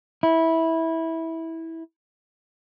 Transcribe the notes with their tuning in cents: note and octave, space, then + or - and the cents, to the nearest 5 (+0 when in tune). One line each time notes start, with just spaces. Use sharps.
E4 -15